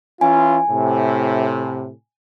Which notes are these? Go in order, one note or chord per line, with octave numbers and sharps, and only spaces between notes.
E3 C#4 F4 G#5
A2 C3